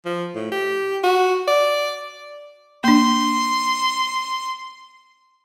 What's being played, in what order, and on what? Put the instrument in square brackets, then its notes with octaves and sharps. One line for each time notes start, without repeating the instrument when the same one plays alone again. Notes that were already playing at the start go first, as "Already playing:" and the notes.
[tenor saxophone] F3
A2
G4
F#4
D5
[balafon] A#3 D4 [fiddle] C6